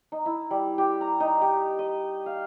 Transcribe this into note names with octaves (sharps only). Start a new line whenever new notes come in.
D#4
E4
G3
G4
A#5
D#4
G4
D#5
F5